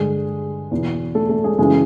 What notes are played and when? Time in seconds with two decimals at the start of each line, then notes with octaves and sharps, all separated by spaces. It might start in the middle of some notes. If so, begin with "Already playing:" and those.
Already playing: G2 D3 G#3 G#4
0.71 E2 B2
1.15 A3 A4
1.29 A3 A4
1.44 G#3 G#4
1.58 F#2 C#3 E3 G#3 G#4